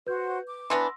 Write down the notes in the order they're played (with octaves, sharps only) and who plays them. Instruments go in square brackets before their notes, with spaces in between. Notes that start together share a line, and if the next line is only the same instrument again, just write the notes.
[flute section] F#4 C5 [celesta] B4 G6
[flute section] D6
[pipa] E3 B3 D4 [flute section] B4 [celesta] C6 E6 A#6